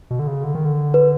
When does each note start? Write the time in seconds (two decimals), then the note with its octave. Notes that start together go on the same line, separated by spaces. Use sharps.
0.11 B2
0.19 D3
0.27 C#3
0.44 D3
0.55 D#3
0.65 D3
0.94 B4